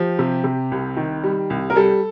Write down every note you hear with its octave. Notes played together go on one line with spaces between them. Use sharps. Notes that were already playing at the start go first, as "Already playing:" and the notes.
Already playing: F3 G4
C3
C3
C2
D#3
G3
C2
A#4
G3 A4